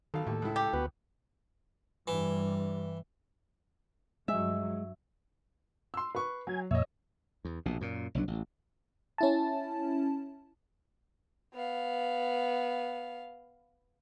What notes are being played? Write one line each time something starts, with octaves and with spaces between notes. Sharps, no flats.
B1 D#3 A4 F5
D#2 A2
C#2 E4
G4
D2 B3 F#4 B4
G2 E3
G2 F#3 G#3 E5
C6 E6
B4 C#6
F#3 G#5
F2 A#2 C#5 D#5 E5
E2
A#1 B2
F#2 A#2
F#1 C2 F#3 D4
A1
C#4 E4 A5
B3 F5